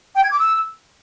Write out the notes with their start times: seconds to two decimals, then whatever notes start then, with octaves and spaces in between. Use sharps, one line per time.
0.15 G5
0.23 G#6
0.31 D6
0.39 E6